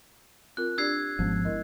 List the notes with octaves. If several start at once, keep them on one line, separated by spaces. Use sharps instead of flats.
C4 F4 A#4 F#6
D4 G4 D5 E6 G#6 C7
G#1 F3 G#3 B3 C#4
E4 A#4 D#5